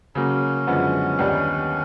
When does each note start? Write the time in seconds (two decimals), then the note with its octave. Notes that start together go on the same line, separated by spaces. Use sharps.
0.15 C#3 F#3 A#3 C#4
0.67 F#2 D3 F3 G#3 B3
1.19 D#2 D#3 G3 B3 D4